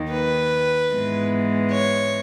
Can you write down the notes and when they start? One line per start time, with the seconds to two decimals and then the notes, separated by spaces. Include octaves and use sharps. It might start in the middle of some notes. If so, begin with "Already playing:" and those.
Already playing: D#2 D#3 A#3
0.11 B4
0.92 G#2 E3 G#3 B3
1.71 C#5